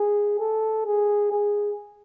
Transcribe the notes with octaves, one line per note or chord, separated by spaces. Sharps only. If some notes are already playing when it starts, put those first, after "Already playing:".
Already playing: G#4
A4
G#4
G#4